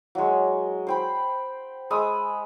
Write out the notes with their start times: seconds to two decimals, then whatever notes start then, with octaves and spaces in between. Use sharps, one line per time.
0.15 F#3 G#3
0.87 C5 G5 B5
1.90 G#3 B5 D#6 E6